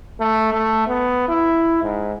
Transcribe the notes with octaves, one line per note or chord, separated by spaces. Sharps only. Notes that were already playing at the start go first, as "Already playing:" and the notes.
A3
A3
B3
E4
G#2